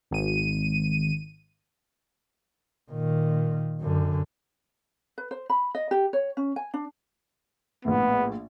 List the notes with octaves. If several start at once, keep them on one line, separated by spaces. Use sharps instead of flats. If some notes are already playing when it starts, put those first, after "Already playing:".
G#1 D#7
A#2 D#3
F#2 D3
B4
C5
B5
D#5
G4
C#5
C#4
G#5
D4
A#1 A2 B3